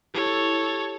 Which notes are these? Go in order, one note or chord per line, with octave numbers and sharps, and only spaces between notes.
E4 G4 A4 C#5